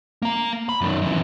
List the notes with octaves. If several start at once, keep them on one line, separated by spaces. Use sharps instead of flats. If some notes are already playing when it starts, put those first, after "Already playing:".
A#3 A#5
B5
F#2 D#3
F#2 E3